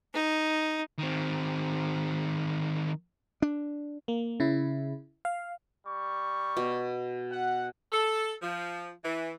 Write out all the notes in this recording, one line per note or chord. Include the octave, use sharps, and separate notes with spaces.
D#4
D#3 C4
D4
A#3
C#3 E4
F5
G3 C#6
B2
F#5
A4
F3
E3